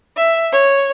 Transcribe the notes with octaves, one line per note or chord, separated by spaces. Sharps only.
E5
C#5